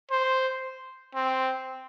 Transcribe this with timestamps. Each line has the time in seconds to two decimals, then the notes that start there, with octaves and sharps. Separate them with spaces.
0.11 C5
1.15 C4